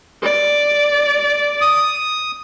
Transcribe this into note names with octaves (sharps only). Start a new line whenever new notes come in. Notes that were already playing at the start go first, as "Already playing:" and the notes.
D5
D#6